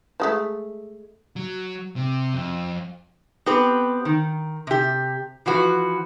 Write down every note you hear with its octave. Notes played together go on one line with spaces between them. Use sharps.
F3 G#3 A3
F#3
C3
F2
B3 C4 G4 B4
D#3
C3 G4
E3 F3 F#4 B4